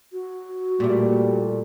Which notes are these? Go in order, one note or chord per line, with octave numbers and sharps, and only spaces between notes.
F#4
A#2 G3 A3